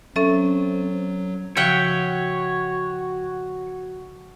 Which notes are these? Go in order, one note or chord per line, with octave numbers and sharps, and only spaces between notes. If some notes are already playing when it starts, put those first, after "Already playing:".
F#3 C4 C#4 A4 E5
C#3 F3 F#4 C#5 E5 F#5 G5